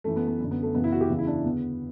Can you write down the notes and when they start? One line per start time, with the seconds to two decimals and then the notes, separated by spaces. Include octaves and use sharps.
0.04 F#2 E3 A3
0.16 B3
0.28 B3
0.40 F#2 D3
0.51 B3
0.63 A3
0.74 F#2 C#3 E3 B3
0.84 E4
0.92 F#4
1.01 G4
1.10 E2 C#3 E3
1.19 E4
1.27 D4
1.44 E2 D3 B3